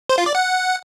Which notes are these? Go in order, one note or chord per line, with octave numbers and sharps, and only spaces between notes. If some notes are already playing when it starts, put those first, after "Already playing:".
C5
F4
D5
F#5